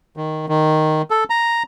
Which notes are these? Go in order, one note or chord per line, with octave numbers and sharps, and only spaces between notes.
D#3
D#3
A4
A#5